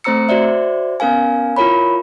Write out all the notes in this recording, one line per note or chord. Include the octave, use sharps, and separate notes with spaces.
A3 C4 C5 A#5 E6 C#7
F#4 C5 D5 E5
B3 C#4 A#4 F5 G#5
E4 F4 A#4 C#5 B5